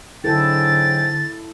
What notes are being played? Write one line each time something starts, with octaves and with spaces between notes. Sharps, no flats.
G#2 D3 F#3 E4 A4 G5 A6